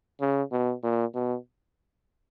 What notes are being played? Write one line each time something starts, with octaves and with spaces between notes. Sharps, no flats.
C#3
B2
A#2
B2